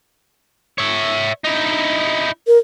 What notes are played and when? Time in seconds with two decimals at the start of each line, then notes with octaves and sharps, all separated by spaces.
0.78 C#5 E5
1.44 D#4 E4
2.47 A#4